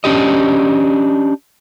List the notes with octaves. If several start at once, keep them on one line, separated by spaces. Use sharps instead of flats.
C#4 D4 G4 D#5